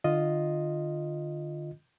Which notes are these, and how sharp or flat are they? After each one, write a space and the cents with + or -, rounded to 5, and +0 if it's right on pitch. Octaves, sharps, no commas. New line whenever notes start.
D3 +35 F4 +0 D#5 +0